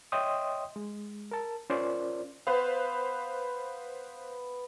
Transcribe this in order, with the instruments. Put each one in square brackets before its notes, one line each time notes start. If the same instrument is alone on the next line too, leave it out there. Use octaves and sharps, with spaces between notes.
[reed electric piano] C#5 D#5 E5 G5 C6 D#6
G#3
A#4 A5
C#4 F4 A#4 C5 D5
[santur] B3 [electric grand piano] B4 C5 F5